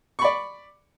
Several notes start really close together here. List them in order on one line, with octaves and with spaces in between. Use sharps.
C#6 B5 D5